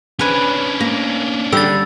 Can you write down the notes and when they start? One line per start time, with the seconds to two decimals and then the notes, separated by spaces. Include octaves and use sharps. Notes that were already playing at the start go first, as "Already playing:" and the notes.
0.19 C#4 D4 B4 G#5
0.80 A#3
1.52 D3 G3 E6 A6